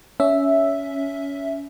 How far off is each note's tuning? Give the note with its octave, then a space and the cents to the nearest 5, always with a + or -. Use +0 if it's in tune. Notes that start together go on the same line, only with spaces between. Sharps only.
C#4 +20 E5 +0